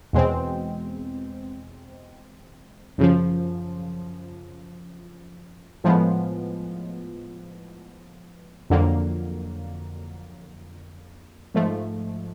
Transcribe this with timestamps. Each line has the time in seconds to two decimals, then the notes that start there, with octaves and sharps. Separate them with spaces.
0.13 E2 B2 G#3 C4
2.98 F#2 C#3 F3
5.84 A2 F3 G#3 B3
8.70 F2 D3 F#3 A#3
11.54 G#2 F3 A3